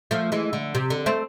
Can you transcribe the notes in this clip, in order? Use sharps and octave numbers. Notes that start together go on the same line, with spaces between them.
F3 A3
E3 G#3
D3
C3
D3
A3 C4